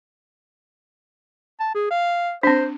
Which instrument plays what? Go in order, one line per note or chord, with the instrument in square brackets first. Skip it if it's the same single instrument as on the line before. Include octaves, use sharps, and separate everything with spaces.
[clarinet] A5
G#4
F5
[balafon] C4 D4 [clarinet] C5